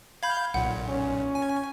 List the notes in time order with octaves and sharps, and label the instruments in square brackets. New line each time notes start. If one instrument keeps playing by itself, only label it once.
[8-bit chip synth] F5 G6 [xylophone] B5 G#6
[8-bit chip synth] B1 A#2 [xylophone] F#5
[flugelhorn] C#4
[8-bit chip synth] G#5